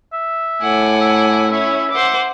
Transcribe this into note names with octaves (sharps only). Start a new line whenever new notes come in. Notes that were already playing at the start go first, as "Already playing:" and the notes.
E5
A2 F#5 G#5 D6
E5
C#4 E4 C#5 E5
C5 F#5 D6